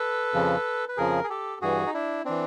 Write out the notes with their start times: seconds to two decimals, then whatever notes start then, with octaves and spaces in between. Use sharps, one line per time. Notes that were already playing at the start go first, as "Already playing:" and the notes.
Already playing: A4 B4
0.34 F2 C#3 F3
0.89 B4
0.97 F2 C#3 F3 G#4 A#4
1.24 G#4
1.30 G4 A4
1.61 G2 E3 F#4 G#4
1.86 D#4
1.94 D4 E4
2.25 E3 C4 D4